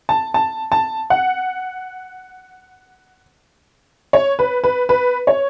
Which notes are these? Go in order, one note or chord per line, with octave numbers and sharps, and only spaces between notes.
A5
A5
A5
F#5
C#5
B4
B4
B4
C#5